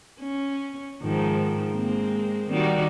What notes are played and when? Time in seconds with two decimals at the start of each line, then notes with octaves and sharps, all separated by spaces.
0.21 C#4
1.02 G#2 D#3 F3
1.73 G#3 A#3 C4
2.50 D#3 G3 F#4